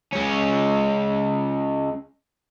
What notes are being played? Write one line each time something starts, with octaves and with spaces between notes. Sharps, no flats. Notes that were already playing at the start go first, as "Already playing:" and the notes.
G#3 C#4